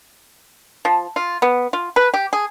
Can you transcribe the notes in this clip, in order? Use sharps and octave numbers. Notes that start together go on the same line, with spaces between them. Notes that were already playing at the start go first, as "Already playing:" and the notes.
F3
F4
B3
F4
B4
G4
G#4